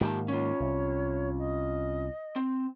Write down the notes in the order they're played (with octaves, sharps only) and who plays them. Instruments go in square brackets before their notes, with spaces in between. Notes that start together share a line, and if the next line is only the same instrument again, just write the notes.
[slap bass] G#2 D#3 A#3 [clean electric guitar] F3 G4 A5
[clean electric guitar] C#4 F4 [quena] C#5
[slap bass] C2
[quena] D#5
[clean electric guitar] C4